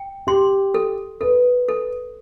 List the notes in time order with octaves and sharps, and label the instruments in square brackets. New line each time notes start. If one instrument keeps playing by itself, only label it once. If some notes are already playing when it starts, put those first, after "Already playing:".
Already playing: [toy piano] G5
[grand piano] G4 [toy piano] C6
[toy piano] A4
[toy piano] A4 [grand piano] B4
[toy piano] A4